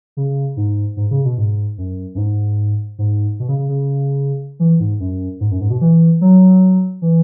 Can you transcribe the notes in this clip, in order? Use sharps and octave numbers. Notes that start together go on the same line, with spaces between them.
C#3
G#2
G#2
C#3
B2
G#2
F#2
F#2
G#2
G#2
B2
C#3
C#3
C#3
E3
G#2
F#2
G#2
F#2
G#2
B2
E3
F#3
E3